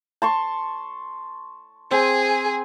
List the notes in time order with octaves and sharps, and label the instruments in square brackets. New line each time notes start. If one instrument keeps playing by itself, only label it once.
[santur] A5 C6 C#6
[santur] C4 [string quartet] G#4 G#5